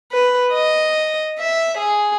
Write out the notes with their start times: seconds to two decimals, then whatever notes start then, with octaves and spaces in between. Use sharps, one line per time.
0.12 B4
0.53 D#5
1.40 E5
1.78 G#4